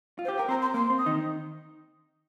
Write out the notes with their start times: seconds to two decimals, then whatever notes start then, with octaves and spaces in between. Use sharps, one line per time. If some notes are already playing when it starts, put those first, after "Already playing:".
0.19 F4
0.24 C5
0.28 G4
0.37 G5
0.39 A#4
0.48 C4 C5 A#5
0.61 C6
0.74 A#3 C6
0.90 C4
0.98 D#6
1.06 D#3 D#4